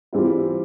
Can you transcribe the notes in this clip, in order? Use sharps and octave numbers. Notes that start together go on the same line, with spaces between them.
E3 G3 C4 F4